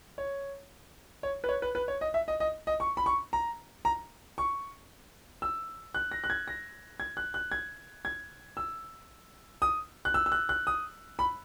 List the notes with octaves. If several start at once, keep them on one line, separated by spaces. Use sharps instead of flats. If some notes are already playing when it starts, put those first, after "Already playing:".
C#5
C#5
B4
C#5
B4
B4
C#5
D#5
E5
D#5
D#5
D#5
C#6
B5
C#6
A#5
A#5
C#6
E6
F#6
A#6
F#6
G#6
A#6
G#6
F#6
F#6
G#6
G#6
E6
D#6
F#6
E6
E6
F#6
F#6
D#6
B5